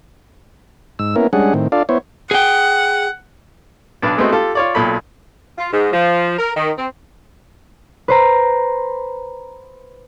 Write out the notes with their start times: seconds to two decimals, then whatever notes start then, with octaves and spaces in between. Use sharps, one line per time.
0.99 G#2 E6
1.16 A#3 B3 C#4 E4 A#4
1.33 G3 G#3 C#4 D4 G#4 F#5
1.54 A2 D#3 C4
1.72 D4 F4 A4 D5 F5
1.89 B3 E4 C5 C#5
2.31 G#4 F#5 G5
4.02 B1 D4 B4 D5
4.17 G#3 A3 B3 C4 D#4 F#4
4.32 F4 G4 A4
4.55 F4 C#5 D5
4.75 B1 A#2 A4 B5
5.58 F4
5.72 G#2
5.92 F3
6.38 A#4
6.56 D#3
6.77 C4
8.08 B4 C5 A#5